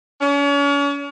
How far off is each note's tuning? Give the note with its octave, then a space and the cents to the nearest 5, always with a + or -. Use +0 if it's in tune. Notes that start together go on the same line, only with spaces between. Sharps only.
C#4 +40